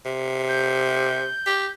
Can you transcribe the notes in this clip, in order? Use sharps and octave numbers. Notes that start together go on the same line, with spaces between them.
C3
G6
G4